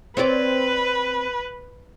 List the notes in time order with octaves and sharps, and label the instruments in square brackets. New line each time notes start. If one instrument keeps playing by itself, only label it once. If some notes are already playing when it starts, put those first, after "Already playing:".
[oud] C4 C#5 D5 [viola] B4